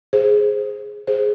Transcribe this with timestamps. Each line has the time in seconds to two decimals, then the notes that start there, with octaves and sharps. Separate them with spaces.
0.13 G#4 C5
1.07 G#4 C5